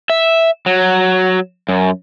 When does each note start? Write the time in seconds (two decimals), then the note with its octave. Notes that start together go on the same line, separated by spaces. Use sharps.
0.10 E5
0.66 F#3
1.69 F#2